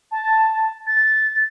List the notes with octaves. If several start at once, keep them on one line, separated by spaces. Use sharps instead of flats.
A5
A6